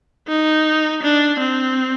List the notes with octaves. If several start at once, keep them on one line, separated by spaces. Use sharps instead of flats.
D#4
D4
C4